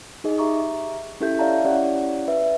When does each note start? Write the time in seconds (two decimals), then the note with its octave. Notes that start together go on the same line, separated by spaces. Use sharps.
0.24 D#4 G#4 D#5
0.38 G4 E5 A#5 C#6 D6
1.20 C#4 E4 G4 A4 E5 G6
1.39 C#5 D5 E5 F5 A5 A#5
1.64 C#4 E4 G4 C#5 D5 F#5
2.28 B4 E5